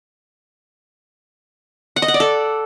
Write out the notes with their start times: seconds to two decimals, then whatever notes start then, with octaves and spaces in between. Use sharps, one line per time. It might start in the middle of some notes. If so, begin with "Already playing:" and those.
1.96 F#5
2.02 D#5
2.08 F#5
2.14 D5
2.20 A4